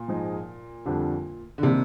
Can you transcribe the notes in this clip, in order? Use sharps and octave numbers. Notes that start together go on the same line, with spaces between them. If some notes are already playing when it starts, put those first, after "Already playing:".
Already playing: A#2
G#2 F3 G#3 D#4 G#4
F2 D3 G3 D4
D3
C3 D#3 G3 A#3 D4